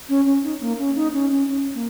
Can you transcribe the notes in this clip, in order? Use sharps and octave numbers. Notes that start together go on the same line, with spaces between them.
C#4
C#4
D#4
A#3
C#4
D#4
C#4
C#4
C#4
A#3